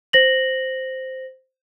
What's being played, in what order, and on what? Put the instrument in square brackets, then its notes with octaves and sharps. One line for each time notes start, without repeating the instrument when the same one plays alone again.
[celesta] C5 A#6 F#7